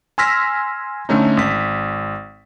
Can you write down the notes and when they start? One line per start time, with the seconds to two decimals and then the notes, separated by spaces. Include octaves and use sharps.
0.18 G#5 C6 E6 F6 A#6 B6
1.09 D3 A3 C#4 D#4
1.37 G#1 B6